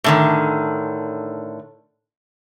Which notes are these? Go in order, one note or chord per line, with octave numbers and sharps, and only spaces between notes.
A2 D3 D#3